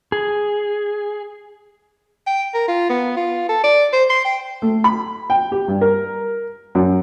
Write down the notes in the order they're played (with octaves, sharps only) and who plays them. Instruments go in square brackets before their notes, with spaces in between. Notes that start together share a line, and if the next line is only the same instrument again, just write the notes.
[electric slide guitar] G#4
[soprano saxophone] G5
A#4
F4
B3
F4
A4
D5
C5
C6
G5
[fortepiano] A3
B5
G5
G4
G2
A#4
F#2